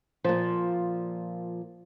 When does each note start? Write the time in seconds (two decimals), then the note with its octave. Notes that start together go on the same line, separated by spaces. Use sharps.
0.24 A#2 F3